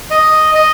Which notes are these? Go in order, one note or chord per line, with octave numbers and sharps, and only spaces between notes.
D#5
D#5